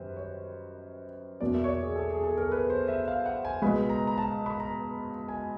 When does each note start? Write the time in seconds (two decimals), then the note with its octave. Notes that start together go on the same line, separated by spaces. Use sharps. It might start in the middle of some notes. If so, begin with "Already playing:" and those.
Already playing: F#2 D#3 G3 B4 C5
0.16 C#5
1.40 E2 B2 F#3 A#3 D5
1.54 E5
1.64 C#5
1.68 D5
1.82 G#4
1.96 A4
2.11 G#4
2.23 A4
2.37 A#4
2.52 B4
2.70 C5
2.88 E5
3.08 F5
3.26 F#5
3.45 G#5
3.62 C#2 B2 G#3 B3 B5
3.90 A#5
4.07 A#5
4.18 A5
4.46 B5
4.60 A#5
5.28 G#5